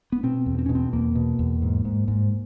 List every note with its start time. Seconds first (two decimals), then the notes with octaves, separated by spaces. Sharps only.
0.12 B3
0.23 B2 C4
0.46 E2
0.59 C4
0.66 B2 C#4
0.75 C4
0.93 E2 A#3
1.15 B2
1.39 E2
1.62 G#2
1.85 G#2
2.08 G#2